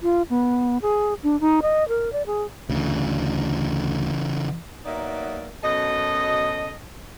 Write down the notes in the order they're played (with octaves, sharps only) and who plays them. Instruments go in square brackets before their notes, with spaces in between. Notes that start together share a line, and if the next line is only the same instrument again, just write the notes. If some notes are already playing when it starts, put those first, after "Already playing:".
[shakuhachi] F4
B3
G#4
D4
D#4
D#5
A#4
D5
G#4
[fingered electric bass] D2 [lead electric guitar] C#3 E3
[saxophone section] F#3 A#3 B3 D#4 D5 E5
F#2 B2 A4 D#5